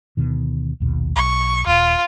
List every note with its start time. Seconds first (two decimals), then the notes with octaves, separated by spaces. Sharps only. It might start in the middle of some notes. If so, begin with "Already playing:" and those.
0.17 D2 B2 D#3
0.80 A#1 D#2 B2
1.16 B1 C#6
1.67 D#1 F4